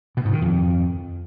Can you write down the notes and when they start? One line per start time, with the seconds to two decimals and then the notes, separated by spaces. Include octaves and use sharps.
0.17 B2
0.25 G#2
0.33 D#3
0.41 F2